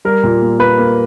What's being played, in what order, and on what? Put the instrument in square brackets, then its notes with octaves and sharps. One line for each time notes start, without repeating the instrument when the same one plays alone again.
[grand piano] G3 A#4
A#2
A#3
A#3 B4
A#3